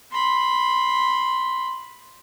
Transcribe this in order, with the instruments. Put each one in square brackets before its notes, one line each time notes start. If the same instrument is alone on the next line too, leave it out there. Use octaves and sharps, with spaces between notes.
[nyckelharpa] B5 C6